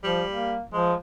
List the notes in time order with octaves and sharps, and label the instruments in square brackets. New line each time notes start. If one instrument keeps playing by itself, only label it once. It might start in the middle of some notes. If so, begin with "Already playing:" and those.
[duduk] F3 [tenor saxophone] G3
[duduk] A#3
[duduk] F3 [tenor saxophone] G#3